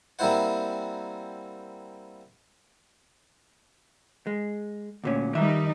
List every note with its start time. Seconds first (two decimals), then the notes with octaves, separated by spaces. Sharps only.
0.19 G3 A#3 C4 E4 C5 F#5
4.27 G#3
5.04 D2 A#2 C#4
5.35 D#3 G3 D#4 E5